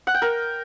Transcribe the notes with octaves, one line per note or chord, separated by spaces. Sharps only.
F#5
G5
A#4